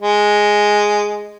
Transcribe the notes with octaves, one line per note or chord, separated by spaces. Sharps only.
G#3